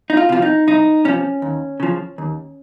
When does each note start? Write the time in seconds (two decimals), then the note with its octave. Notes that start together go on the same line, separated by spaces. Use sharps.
0.10 D#4
0.17 F4
0.29 C3 F3 F4
0.42 D#4
0.67 C2 D#4
1.05 C3 F3 C#4
1.42 D#2
1.80 C#3 F3
2.18 D#2